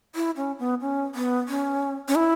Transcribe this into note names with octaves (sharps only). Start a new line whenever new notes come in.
E4
C#4
B3
C#4
B3
C#4
C#4
E4